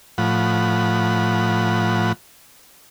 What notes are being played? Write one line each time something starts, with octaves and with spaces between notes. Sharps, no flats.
A2 F3 F#5 B5